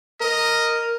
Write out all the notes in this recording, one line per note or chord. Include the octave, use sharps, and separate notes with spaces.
A#4 D#5